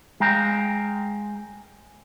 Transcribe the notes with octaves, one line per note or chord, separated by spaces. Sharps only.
G#3 F5 G5 A#5